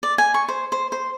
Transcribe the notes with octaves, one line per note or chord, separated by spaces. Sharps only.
D5
G#5
C#6
C5
C5
C5